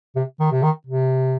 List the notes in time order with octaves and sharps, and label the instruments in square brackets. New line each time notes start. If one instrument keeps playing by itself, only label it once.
[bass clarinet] C3
D#3
C3
D#3
C3